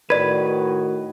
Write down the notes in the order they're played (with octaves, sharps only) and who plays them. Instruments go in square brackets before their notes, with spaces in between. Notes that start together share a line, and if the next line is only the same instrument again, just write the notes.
[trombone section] A2 D#3 F#4 [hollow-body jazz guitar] B4 [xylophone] D5 G#6